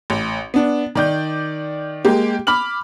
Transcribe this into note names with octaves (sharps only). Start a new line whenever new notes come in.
A1
B3 D4
D#3 D5 G6
G#3 A#3 G4
B5 D6 F6 F#7